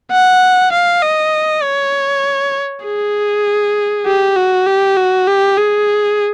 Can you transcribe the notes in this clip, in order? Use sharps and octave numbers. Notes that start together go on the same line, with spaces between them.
F#5
F5
D#5
C#5
G#4
G4
F#4
G4
F#4
G4
G#4